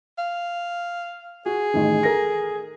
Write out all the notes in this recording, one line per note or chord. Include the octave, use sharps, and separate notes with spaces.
F5
F#4 G#4
A1 D#3
A4 A#4 A#6